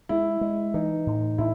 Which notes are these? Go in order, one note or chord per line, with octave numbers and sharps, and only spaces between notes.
G#3 E4
G#3
E3 D#4
A2
A2 E4